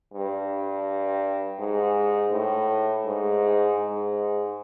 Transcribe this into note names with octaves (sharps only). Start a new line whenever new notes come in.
G2
G#2
A2
G#2
G#2